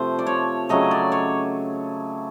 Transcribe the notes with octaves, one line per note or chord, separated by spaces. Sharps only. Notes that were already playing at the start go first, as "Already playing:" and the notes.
Already playing: C3 F3 A3 C5
D5
C#5
C#3 F#3 A3 D#5
D5
C#5